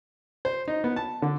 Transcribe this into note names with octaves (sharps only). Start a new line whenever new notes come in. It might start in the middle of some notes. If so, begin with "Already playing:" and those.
C5
D#4
B3
A5
D3